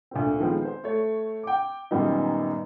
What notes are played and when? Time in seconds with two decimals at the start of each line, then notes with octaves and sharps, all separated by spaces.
0.11 D2 A#2 C4
0.40 D#3 F3 G#3 B3 C4
0.65 C5
0.84 A3 C#5
1.43 G5 D6
1.91 F#2 A#2 D#3 G3 B3 D#4